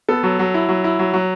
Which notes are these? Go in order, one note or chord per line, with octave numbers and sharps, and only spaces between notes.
B3 A4
F#3
F#3
E4
F#3
E4
F#3
F#3